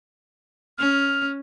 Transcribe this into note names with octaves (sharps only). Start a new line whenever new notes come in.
C#4 F6